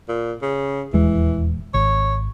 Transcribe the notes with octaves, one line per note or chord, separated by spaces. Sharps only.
A#2
C#3
D#1 E2 E3 G#3
G#1 C#5